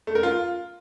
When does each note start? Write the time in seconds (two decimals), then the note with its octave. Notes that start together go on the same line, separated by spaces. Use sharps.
0.07 A3
0.15 A#4
0.23 F4